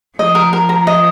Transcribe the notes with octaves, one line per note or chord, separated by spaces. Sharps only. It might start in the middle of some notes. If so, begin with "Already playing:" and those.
F3 D#5
A#4
A#4
A#5
D#5